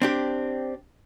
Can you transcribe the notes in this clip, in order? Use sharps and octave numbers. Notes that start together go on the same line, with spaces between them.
C4 D4 G4